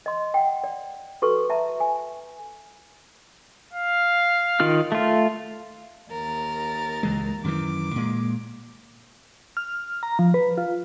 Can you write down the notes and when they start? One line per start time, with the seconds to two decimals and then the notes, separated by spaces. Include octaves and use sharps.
0.06 D#5 C6
0.34 F#5 G5
0.64 D5
1.22 F#4 A4 B4 C#6
1.50 E5 A5 A#5
1.80 G#5
3.73 F5
4.60 D#3 F4 F6
4.92 A3 F4
6.10 D#2 A#4 A6
7.03 C#2 E3 G#3
7.44 F#2 D#3 E3 D6
7.96 A#2 G#3
9.57 F6
10.03 A#5
10.19 F3
10.34 B4
10.58 F4